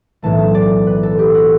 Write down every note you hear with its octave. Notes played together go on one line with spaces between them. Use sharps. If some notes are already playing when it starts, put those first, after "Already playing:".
B1 A2 E3 A3 A5
A5
D5
B4
A4
G4
F#4